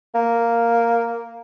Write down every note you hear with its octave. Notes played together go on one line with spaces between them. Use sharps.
A#3